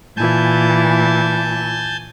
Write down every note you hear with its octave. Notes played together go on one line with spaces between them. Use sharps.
A#2 E3 G#5 A5 G6